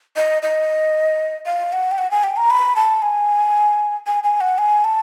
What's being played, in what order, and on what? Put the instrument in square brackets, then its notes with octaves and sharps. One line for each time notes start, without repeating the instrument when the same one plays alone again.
[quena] D#5
D#5
F5
F#5
G5
F#5
G#5
G5
A#5
B5
A5
G#5
G#5
G#5
F#5
G#5
A5